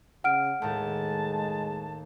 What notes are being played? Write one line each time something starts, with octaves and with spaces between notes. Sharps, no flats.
C#3 F#5 F6 D7
D#2 A2 G#3 A5